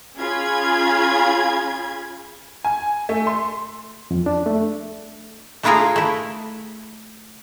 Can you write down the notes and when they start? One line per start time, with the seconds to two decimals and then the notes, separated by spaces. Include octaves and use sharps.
0.17 C#4 F4 G#4 B5 G#6
2.65 G#5
3.09 A3
3.27 C6
4.11 F2
4.26 D4
4.46 A3
5.63 A3 D4 E4 F4 G#4 A#4
5.96 A3 E4